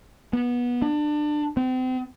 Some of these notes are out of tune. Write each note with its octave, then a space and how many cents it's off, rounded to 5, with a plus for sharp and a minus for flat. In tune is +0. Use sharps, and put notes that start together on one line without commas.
B3 -20
D4 +25
C4 -35